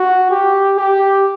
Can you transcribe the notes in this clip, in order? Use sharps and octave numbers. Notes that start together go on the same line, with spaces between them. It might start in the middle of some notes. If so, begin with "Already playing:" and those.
Already playing: F#4
G4
G4